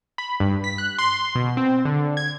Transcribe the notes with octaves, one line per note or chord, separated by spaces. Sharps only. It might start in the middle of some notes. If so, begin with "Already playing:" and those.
B5
G2
B6
F#6
C6
B2
C4
D3
G#6